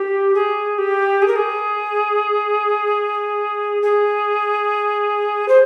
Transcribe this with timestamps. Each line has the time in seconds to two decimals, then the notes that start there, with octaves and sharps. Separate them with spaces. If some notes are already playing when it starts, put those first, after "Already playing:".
Already playing: G4
0.34 G#4
0.78 G4
1.22 G#4
1.28 A#4
1.36 G#4
3.82 G#4
5.48 C5